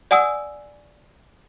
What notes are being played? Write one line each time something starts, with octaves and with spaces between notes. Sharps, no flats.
D5 F#5 G#5 D#6 E6